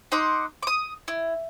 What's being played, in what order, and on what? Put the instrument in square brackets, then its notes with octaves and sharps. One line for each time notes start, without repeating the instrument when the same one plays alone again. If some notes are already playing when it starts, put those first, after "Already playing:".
[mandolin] D#4 F#5 C6 D6
D6 D#6
E4